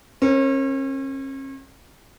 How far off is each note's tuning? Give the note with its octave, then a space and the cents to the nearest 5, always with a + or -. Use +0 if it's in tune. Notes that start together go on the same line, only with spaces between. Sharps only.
C#4 -40 A#4 +0